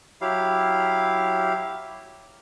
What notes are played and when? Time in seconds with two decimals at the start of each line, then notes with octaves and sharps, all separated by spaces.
0.21 F#3 E4 G4 F5